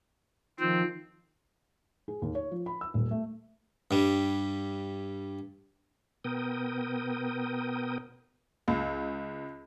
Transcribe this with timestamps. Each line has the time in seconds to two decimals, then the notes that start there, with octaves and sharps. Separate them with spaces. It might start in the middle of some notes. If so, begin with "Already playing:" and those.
0.60 D#3 F3 C4
2.08 G#4
2.22 D#2
2.35 C#5
2.51 F3
2.66 B5
2.81 E6
2.94 D#1
3.11 A3
3.91 G2 G3
6.24 B2 B3 A#4 G5 D#6
8.68 C#2